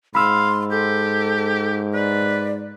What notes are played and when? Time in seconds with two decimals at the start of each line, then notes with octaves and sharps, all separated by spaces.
0.15 G#2 F5 B5 C6 E6
0.71 G4 A4
1.94 B4 D5